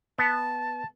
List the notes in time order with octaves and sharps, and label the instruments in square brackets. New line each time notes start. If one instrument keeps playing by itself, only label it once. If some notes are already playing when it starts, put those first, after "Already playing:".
[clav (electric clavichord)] B3 [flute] A5